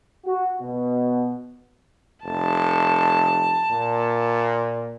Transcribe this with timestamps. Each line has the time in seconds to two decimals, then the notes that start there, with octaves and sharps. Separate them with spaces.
0.25 F#4
0.61 B2
2.24 F1 A5
3.71 A#2